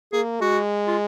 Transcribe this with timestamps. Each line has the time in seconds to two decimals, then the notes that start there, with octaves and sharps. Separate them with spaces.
0.13 A#3 G#4
0.41 G#3 F#4
0.88 F4